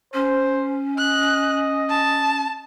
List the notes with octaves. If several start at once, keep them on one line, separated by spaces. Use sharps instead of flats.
C#4 C5
D#5 F#6
A5